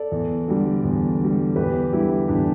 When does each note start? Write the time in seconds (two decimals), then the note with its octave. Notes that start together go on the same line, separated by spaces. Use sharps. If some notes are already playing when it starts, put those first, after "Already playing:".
Already playing: A4 D5
0.12 E2
0.48 D3 G3
0.84 E2
1.21 D3 G3
1.56 E2 G4 B4
1.93 D3 G3 E4
2.00 G4
2.08 E4
2.28 E2 D4 G4